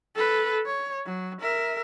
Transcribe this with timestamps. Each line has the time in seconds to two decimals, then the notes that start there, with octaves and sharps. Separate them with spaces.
0.16 A4 B4
0.66 C#5
1.06 F#3
1.42 A#4 E5